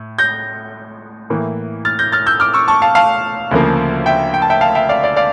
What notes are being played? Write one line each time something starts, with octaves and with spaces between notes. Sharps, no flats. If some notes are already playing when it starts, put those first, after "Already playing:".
Already playing: A2
G6 A#6
A2 E3 A#3
F6 A6
G6 A#6
F6 A6
E6 G6
D6 F6
C#6 E6
A5 C#6
F5 A5
F5 A5
D2 C#3 F3 A#3
E5 G5
G5
A5
E5 G5
F5 A5
E5 G5
D5 F5
D5
D5 F5